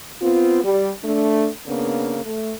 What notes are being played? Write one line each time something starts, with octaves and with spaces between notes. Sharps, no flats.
B3 C4 F4
G3
A3 D4
C#3 A#3 B3 D4
A3